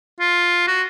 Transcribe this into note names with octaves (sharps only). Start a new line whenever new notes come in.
F4
F#4